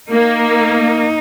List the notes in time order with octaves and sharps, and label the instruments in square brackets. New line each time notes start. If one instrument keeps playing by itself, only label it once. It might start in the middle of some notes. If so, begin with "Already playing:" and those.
[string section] A#3 [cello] D#4